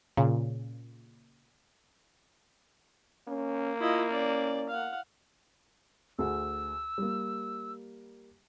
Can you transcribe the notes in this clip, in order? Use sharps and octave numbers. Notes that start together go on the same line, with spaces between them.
A#2 C#3
A#3 C#4
E4 F4 D#5
C#4 D5
F5 F#5
D2 G#4 F#5 E6
G3 A#3